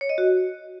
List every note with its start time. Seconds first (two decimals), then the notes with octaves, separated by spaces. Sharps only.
0.01 C#5
0.09 D#5
0.18 F#4